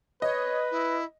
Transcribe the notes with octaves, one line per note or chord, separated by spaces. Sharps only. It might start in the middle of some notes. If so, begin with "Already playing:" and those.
B4 C#5 D#5
E4